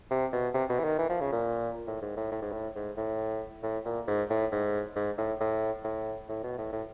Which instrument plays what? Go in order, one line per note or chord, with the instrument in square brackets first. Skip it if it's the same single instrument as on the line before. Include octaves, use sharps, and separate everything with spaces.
[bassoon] C3
B2
C3
B2
E3
D#3
E3
F3
C#3
A#2
A2
G#2
A2
A2
G#2
A2
G#2
A2
A2
A#2
G#2
A2
G#2
G#2
A2
A2
A2
A2
B2
A2
A2